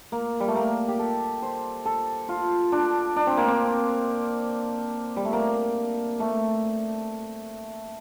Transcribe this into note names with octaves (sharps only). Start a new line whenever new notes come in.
A#3
G3
A3
A#3
G4
A4
C5
A4
F4
D4
D4
C4
A#3
C4
G3
A3
A#3
A3